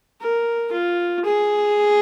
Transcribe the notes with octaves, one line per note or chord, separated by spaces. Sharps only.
A#4
F4
G#4